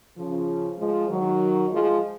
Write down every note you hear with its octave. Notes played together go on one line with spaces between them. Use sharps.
C#3 F3
F3 G#3
D#3 F#3
F3 G#3